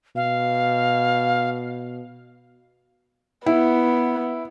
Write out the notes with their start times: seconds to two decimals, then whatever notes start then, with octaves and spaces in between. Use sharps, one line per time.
0.16 B2 F5
3.46 B3 E4